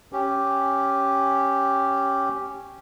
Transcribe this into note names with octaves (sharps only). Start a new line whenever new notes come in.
C#4 G4